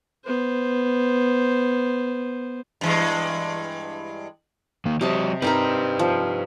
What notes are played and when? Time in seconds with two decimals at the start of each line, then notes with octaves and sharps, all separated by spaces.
0.24 B3 C5
2.81 G2 E3 G#3
4.85 D#3 A#3
5.01 C3 F#3 G4 D#5 A5
5.42 C4 D#4 G4 A#4 B4
5.99 F3